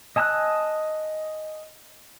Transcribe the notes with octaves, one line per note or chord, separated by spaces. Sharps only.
D#5 G#5 A5 E6 F#6